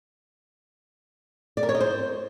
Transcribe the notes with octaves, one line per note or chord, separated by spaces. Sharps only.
D5
A#4
C#5
D#5
C5